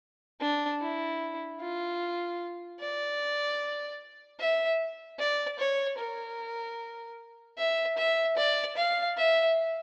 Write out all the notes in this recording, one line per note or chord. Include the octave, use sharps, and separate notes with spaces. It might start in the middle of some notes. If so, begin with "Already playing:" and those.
D4
E4
F4
D5
E5
D5
C#5
A#4
E5
E5
D5
F5
E5